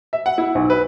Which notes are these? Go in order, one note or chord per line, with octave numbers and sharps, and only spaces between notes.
E5
F#5
E4
B1
B4